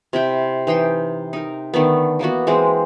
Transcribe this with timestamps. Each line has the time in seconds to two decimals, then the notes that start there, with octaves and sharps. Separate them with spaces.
0.13 C3 E4 G5
0.67 E3 D#4 G5 C6
1.33 D#4 A#4
1.74 D3 D#3 A3 B3
2.19 E3 A#3 B3 F#4
2.47 E3 G#3 C4 C5